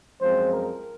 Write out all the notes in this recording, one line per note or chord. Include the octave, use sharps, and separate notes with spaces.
F#2 F3 G#3 C4 C5
A#4